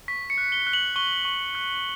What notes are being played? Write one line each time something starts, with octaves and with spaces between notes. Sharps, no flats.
C#6 B6
C#7
F#6
G7
F#6
F#7
C#6 G7
C#6
F#6